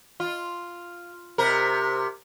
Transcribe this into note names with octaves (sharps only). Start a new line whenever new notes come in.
F4
C3 A#4